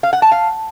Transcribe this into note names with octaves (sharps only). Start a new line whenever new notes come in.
F5
F#5
A5
F5